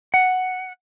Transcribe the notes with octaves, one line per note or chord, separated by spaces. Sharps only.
F#5